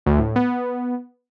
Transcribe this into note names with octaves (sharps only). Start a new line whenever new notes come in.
D2
A2
B3